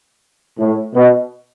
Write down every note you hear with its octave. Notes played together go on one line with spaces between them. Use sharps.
A2
B2